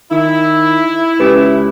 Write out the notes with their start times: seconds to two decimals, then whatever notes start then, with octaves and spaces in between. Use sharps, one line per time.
0.11 D#3 E4
1.20 C#2 C#4 G4 B4